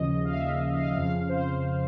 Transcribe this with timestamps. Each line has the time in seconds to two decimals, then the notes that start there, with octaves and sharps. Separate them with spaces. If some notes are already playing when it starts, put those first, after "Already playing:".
Already playing: D#2 C#3 F3 D#5
0.25 F5
0.32 E5
0.76 F5
0.97 F2 C#3 F3 F5
1.29 C5